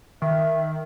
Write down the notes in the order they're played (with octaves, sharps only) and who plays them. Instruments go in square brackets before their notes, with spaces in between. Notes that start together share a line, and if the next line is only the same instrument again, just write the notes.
[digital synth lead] D#3 [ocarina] E5